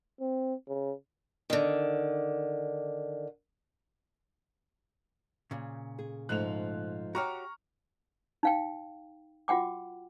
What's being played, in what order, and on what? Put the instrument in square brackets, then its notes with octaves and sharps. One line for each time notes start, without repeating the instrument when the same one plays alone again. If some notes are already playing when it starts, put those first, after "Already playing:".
[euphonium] C4
C#3
[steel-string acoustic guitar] D3 D#3
[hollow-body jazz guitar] A#2 C#3
[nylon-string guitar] G#4
[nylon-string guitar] G#2 F3 A3 [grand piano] F#6 F7
[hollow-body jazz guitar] F#4 G4 C#5 [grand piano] A#5 C#6 F6
[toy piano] D#4 F5 G5
F4 F#4 F#5 G5 D6